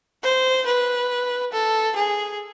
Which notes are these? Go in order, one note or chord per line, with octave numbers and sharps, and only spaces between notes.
C5
B4
A4
G#4